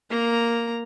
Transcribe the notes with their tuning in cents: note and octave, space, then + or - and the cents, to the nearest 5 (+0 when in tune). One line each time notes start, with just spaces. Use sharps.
A#3 +0 A#5 +0